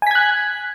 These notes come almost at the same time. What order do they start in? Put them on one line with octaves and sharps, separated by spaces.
G#5 B6 G#6 F#6